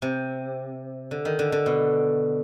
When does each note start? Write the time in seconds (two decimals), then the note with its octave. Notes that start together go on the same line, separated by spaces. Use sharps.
0.02 C3
1.11 D3
1.25 D#3
1.39 D3
1.52 D3
1.66 B2